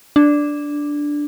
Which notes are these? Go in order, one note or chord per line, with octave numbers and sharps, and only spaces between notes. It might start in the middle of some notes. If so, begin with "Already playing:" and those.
D4